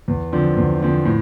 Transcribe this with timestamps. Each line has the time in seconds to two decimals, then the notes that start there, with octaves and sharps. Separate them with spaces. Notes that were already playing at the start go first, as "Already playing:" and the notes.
0.08 E2
0.32 D3 F3 C4
0.57 E2
0.81 D3 F3 C4
1.05 A2